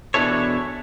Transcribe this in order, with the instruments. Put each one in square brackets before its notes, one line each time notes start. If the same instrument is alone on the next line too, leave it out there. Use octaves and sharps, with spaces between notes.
[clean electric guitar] E2 B2 D4 E4 A4 C#5